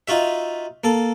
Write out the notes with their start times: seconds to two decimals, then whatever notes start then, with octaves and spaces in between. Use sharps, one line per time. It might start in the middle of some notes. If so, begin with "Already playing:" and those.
0.08 D#4 F4 F#4 E5
0.84 A#3 A4